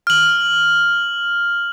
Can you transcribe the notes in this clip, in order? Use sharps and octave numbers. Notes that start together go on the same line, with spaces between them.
F6 F#7